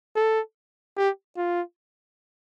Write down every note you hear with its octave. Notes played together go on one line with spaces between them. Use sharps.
A4
G4
F4